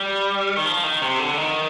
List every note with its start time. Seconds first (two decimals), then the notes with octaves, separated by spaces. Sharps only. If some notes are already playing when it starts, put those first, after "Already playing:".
Already playing: G3
0.57 D#3
0.66 F3
0.83 D#3
1.02 C3
1.19 D3
1.38 D#3